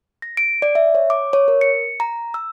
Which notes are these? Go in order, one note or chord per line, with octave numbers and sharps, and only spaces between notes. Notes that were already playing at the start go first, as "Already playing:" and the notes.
A#6
D7
D5
E5
C#5
D6
C#5
A#4
C#7
A#5
E6